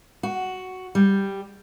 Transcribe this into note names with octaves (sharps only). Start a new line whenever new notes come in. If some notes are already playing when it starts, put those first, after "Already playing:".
F#4
G3